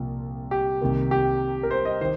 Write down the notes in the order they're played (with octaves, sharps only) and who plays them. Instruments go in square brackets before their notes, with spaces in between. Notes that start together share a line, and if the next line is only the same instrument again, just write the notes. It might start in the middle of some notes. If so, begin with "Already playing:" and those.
Already playing: [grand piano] C2 A#2 F3 A#3
G4
C2 C3 D#3 A#3
G4
A#4
C5
D#5
D#3 C5